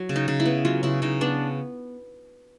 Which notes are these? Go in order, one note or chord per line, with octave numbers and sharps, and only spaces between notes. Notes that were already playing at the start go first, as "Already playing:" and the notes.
Already playing: F#3
C#3
D#4
C#3
E4
B3
F#3 F4
C#3 E4
C#3 D#4
B3 D4